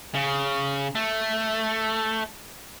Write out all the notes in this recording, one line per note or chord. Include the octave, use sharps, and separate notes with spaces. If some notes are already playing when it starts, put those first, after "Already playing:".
C#3
A3